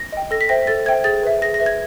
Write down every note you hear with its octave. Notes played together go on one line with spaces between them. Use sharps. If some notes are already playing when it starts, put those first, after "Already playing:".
Already playing: A#6
D#5 G5
A4 A#6
B6
C5 E5 G5 A#6
A4 A6
C5 E5 G5 G#6
G#4 A6
B4 E5
G#4 A#6
A#6
B4 E5
G#6